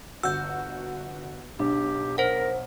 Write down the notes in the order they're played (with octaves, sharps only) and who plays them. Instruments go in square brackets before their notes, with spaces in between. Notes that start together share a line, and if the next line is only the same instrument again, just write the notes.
[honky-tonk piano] G1 F#4 [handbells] E6 G6
[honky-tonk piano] B1 [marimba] D4 [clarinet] G4
[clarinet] A#4 [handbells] C5 F#5